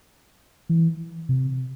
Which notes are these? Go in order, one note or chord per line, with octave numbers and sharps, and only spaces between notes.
E3
C3